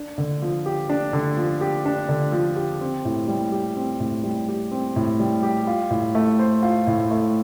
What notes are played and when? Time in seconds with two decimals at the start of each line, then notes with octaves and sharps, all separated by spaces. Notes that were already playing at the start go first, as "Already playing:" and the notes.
Already playing: D4
0.18 D3
0.42 F3
0.66 G4
0.89 D4
1.13 D3
1.37 F3
1.61 G4
1.86 D4
2.09 D3
2.32 F3
2.56 G4
2.81 C4
3.05 A2
3.28 G3
3.52 G4
3.76 C4
4.00 A2
4.24 G3
4.48 G4
4.72 C4
4.96 A2
5.19 G3
5.43 G4
5.67 F4
5.91 A2
6.15 A3
6.39 C5
6.63 F4
6.87 A2
7.11 A3